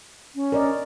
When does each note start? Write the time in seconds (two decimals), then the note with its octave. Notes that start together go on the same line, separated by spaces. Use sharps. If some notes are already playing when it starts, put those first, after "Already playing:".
0.35 C#4
0.52 A#4 D5 D#5